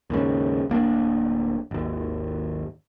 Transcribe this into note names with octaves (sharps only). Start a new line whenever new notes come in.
D#2 G#2 C#3
D1 A#3 D4
G#1 D#2